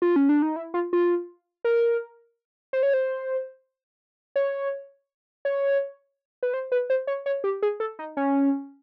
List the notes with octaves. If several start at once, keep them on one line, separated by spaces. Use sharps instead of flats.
F4
C#4
D4
D#4
E4
F4
F4
A#4
C5
C#5
C5
C#5
C#5
B4
C5
B4
C5
C#5
C#5
G4
G#4
A4
D#4
C#4